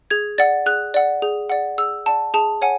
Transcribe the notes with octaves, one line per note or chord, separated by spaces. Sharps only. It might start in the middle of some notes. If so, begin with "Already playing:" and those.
G#4 G#6
D5 F#5 A6
G#4 F#6
D5 F#5
G#4
D5 F#5
G#4 E6
D5 F#5 A5
G#4 A5
C#5 F#5 G#5